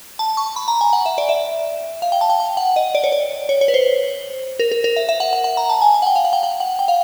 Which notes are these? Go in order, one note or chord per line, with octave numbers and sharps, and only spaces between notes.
A5
C#6
B5
A#5
G#5
F#5
E5
D5
E5
F5
G5
A5
G5
G5
F#5
D#5
D5
C#5
D5
C#5
C#5
B4
C5
A#4
A#4
A#4
E5
E5
F#5
F#5
F#5
A#5
A5
G#5
G#5
F#5
G5
F5
F#5
G5
F#5
F#5
G5
F5